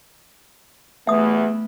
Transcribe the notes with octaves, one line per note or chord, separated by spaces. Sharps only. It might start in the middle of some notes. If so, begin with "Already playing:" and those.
A1 E2 E3 A3 B3 E5 D#6